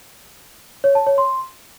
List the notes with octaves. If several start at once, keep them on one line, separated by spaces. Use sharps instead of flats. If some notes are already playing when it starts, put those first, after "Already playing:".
C#5
A5
C#5
C6